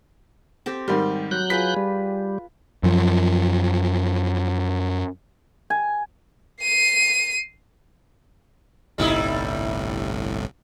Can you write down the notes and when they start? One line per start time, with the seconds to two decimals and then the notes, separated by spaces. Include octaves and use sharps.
0.66 C4 G4 A4
0.88 G#2 D#3 G3 C6
1.31 F#3 F#6 G6
1.50 F4 G#4 B4 B6
1.77 G3
2.83 F#2 F3
5.70 G#5
6.62 C7 D#7
8.98 G1 C2 A2 G3 D#4 E4